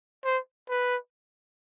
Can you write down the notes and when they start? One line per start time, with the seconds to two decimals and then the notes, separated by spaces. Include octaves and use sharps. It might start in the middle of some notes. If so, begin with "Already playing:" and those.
0.24 C5
0.69 B4